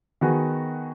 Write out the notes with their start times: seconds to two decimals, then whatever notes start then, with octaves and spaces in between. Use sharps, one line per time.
0.21 D#3 B3 F#4 G#4